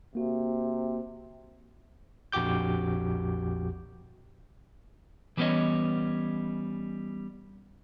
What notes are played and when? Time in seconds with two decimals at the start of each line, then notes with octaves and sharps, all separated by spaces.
0.15 C3 A#3 F#4
2.32 A#1 F2 F#4 G4 D6 G6
5.37 E3 G3 B3 C#4 C#5 D#5